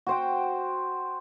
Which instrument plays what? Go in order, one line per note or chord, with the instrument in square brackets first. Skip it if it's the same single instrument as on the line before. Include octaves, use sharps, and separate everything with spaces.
[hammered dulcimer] F#4 C5 G5